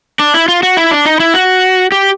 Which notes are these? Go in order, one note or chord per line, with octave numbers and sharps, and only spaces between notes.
D4
E4
F4
F#4
E4
D4
D#4
E4
F#4
G4